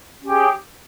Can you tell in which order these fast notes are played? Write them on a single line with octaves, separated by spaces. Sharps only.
C#4 G4 G#4